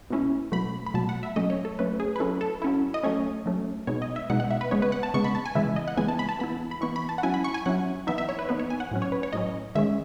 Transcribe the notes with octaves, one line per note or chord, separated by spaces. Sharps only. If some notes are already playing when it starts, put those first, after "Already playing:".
B2 A3 C#4 E4
B2 F#3 A3 B5
B5
B2 F#3 A3 A5
F#5
E5
F#3 A3 C#4 D#5
C#5
A4
F#3 A3 C#4 B4
G#4
B4
F#3 C#4 E4 A4
A4
F#3 C#4 E4
D#5
F#3 A3 C#4 C#5
F#3 A3 C#4
B2 G#3 B3 D#4 C#5
D#5
E5
B2 G#3 B3 D#4 F#5
F#5
E5
B4
C#3 G#3 B3 C#5
B4
F#5
A5
C#3 G#3 B3 C#6
B5
A5
G#5
C#3 E3 G#3 B3 E5
D#5
F#5
C#3 E3 G#3 B3 G#5
A5
B5
A5
E3 B3 E4 B5
B5
E3 B3 E4 C#6
B5
A5
F#5
F#3 C#4 E4 G#5
B5
C#6
G#5
F#3 C#4 E4 F#5
E3 B3 D#4 E5
E5
C#5
B4
E3 B3 D#4 B4
C#5
G#5
F#5
A2 F#3 C#4
C#5
B4
C#5
A2 F#3 C#4 D#5
D#3 G#3 C#4 E5